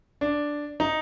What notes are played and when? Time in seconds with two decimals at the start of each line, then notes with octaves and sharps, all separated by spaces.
0.21 D4
0.80 D#4